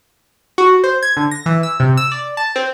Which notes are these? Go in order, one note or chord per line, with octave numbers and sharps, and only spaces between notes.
F#4
C5
G#6
D3
A#6
E3
E6
C3
E6
D5
A5
C4